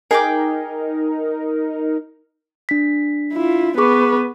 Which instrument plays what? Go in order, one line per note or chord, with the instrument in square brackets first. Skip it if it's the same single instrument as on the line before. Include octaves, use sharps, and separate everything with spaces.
[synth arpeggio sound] D#4 A#4 [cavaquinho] G#4 G5 D6
[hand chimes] D4 B6
[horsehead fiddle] E4 F4
[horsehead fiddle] B3 B4 [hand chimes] G#4 C#6 D6